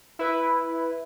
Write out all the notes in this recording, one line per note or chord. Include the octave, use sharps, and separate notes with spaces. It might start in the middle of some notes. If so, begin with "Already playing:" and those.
E4 B4